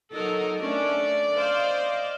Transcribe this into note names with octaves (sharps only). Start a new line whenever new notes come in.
F#3 D#4 A4 A#4
A3 C#4 D4 D5
C5 D#5 F5